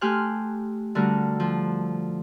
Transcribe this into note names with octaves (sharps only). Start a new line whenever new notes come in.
A3 G4 G#5 C6 F6 F#6
D3 G3 A3 F#4 A#4
F3